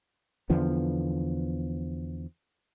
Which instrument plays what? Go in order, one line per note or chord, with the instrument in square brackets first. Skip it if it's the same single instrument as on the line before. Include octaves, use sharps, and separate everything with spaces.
[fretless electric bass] E2 D3 F3 B3